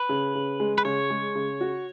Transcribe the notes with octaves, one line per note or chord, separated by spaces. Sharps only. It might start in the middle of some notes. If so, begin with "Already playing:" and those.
Already playing: B4
C#3
C#3
G#3
B4
C#3 C#5
G#3
C#3
F#4